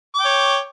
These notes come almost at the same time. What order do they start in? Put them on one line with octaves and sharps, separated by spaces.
D6 G5 C#5